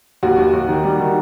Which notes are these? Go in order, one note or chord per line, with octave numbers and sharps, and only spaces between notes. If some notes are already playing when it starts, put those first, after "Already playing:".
D#2 F#4
D#2
D#2
D#3
G3
D#3